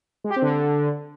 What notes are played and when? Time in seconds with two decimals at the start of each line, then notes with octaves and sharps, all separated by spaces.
0.24 G#3
0.30 G4
0.36 C4
0.42 D3